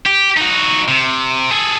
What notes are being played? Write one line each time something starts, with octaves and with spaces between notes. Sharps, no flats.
G4
D#4 F#4
C3
G#4 A4